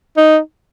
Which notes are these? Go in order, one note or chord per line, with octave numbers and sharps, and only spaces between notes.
D#4